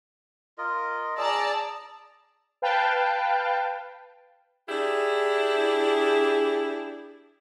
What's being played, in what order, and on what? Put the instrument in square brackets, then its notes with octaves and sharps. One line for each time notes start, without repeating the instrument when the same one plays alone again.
[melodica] F4 A#4 D#5
[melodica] G#4 E6 [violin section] D5 A5 A#5
[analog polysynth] B4 F5 G5 A5
[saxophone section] D4 E4 G4 G#4